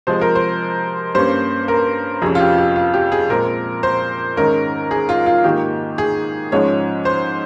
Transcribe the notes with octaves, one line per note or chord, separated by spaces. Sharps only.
C3 F3 G#3 C5
A#4
C5
G2 G3 A#3 C#4 C5
A#4
F2 C3 G3 C#4 G#4
F4
G4
G4
F4
G4
G#4
A#2 G#3 C4 A#4
C5
G#2 D#3 G#3 C#4 A#4
G#4
F4
F4
G#2 D#3 A#3 G4
G#4
G#2 F3 G#3 C#4 C#5
C5